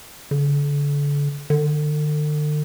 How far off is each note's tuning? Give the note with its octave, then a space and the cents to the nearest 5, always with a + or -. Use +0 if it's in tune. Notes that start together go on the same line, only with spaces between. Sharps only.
D3 -35
D3 +40